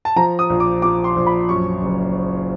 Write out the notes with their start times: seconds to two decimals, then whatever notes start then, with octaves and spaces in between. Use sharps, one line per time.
0.05 A5
0.16 F3 A#5
0.39 D#6
0.50 A#1
0.60 D6
0.82 F3 D6
1.04 C6
1.16 A#1
1.27 B5
1.49 F#2 C#6
1.83 F#1